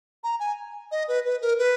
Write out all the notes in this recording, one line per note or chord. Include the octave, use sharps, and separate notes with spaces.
A#5
G#5
D#5
B4
B4
A#4
B4